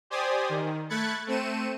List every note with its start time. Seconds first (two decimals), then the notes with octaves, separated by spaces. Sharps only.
0.10 G4 C5 D5 G#5 D#6
0.49 D#3
0.89 A3 B5 F#6 G#6 A6 C#7
1.27 A3 C4 C#7 D#7 E7